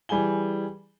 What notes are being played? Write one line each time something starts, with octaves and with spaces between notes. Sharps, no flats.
E3 G3 G#4 G#5 G7